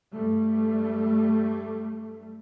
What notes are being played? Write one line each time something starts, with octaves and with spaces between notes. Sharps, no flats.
G2 G3 A3